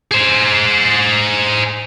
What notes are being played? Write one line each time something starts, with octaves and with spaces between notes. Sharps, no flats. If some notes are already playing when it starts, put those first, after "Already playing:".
G#4 C5